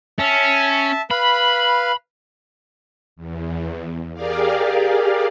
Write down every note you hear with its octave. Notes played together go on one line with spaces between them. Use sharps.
C#4 E5 A5
B4 F5 B5
E2
G4 G#4 A#4 D5 F5